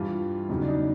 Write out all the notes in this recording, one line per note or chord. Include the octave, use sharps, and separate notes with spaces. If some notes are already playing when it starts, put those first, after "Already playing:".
Already playing: G2 E3 G3 F4
E2 C#3 F#3 D#4
D4
D#4